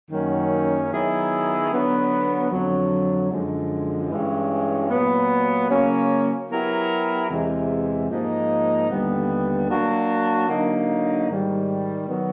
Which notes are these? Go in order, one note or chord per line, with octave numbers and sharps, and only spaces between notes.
F#2 D#3 F#3 A#3 C#4
D#3 F#3 B3 E4 G#4
D3 F#3 B3
F2 D3 F#3
F#2 D3 F3 G#3
G2 E3 G#3 C#4
A#2 F#3 B3
C#3 F#3 A#3 C#4
F#3 B3 E4 G4 A#4
E2 C3 E3 G#3
G#2 F3 A#3 D#4
D#2 D3 G3 B3
F#3 A#3 D4 F#4
D3 F#3 A#3 D#4
G#2 D#3 G3
D#3 F#3 B3